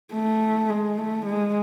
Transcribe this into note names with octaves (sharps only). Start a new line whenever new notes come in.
A3
G#3
A3
G#3